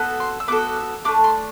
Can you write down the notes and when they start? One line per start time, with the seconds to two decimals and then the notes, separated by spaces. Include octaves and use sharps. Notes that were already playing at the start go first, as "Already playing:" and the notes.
Already playing: B3 F#4 A4
0.20 C6
0.40 E6
0.48 B3 F#4 A4 D6
0.76 E6
1.05 A3 D4 G4 D6
1.24 C6